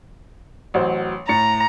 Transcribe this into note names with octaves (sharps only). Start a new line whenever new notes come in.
A1 F#3 C5
A2 A#5 A6 C#7